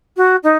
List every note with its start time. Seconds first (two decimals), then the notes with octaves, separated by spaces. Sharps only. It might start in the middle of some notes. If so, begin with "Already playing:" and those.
0.17 F#4
0.43 D#4